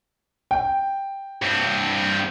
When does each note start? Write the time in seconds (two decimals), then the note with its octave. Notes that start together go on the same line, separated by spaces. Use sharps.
0.51 G5
1.42 G2 C4